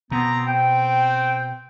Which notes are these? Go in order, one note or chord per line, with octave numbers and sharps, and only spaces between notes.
B2 B3 C4 A#5
C4 G5